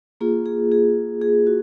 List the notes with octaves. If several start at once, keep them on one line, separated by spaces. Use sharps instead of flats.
A#3 F4 G#4
G#4
G#4
G#4
F#4